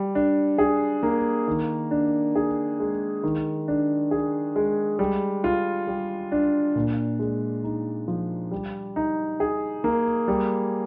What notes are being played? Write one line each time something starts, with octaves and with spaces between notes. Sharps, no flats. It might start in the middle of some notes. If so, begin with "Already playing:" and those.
Already playing: G3
D4
G#4
A#3
D#3
D4
G#4
G#3
D#3
D4
G#4
G#3
G3
F4
G3
D4
A#2
G#3
D#4
F3
G3
D#4
G#4
A#3
G3